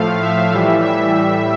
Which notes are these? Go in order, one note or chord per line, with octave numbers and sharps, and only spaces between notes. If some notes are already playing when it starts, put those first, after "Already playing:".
Already playing: A2 F3 A3 F5
E5
A2 E3 G3
E5
A2 G3